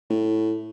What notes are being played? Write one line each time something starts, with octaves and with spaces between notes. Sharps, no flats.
A2